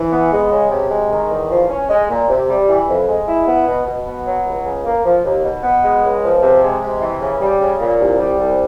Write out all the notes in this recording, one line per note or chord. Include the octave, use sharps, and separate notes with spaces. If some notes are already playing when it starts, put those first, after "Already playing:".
Already playing: E3
B3
G#3
C#3
C3
G#3
D#3
E2
F3
C#4
G#3
A#2
C3
G3
E3
F2
G#3
E4
B3
B2
B2
B3
F#3
C#2
C#3
A#3
F3
D#2
B2
B3
G#3
C#2
F3
C3
G#3
C3
E3
C#3
G3
C#3
A#2
C2
G3
C2